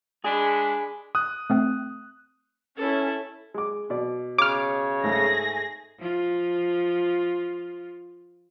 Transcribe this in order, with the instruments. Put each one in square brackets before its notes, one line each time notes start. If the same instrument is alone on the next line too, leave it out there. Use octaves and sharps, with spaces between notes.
[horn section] G#3 D4 B5 [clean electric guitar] G#4
[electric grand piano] D#6 F#6
[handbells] A3 C4 G5
[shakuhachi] C#4 [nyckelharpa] E4 A4
[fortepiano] G#3 D6
B2 D5
[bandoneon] C#3 C#5 [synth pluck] D6 F6
[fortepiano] G#2 A3 [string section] G#4 A#6
[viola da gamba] F3 F4